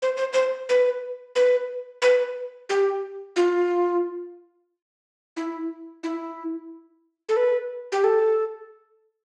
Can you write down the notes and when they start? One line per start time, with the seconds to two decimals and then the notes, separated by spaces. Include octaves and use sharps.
0.02 C5
0.17 C5
0.33 C5
0.69 B4
1.36 B4
2.02 B4
2.69 G4
3.36 F4
5.37 E4
6.03 E4
7.29 A4
7.37 B4
7.92 G4
8.04 A4